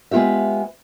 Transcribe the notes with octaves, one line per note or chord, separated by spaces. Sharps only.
G#3 B3 F4 G4 E5